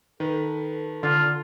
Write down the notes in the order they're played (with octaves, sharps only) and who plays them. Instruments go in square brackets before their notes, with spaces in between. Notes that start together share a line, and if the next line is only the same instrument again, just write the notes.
[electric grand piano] D#3 B4 [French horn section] A4
[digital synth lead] D3 [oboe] F4